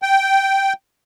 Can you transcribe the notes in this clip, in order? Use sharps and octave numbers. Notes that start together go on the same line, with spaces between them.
G5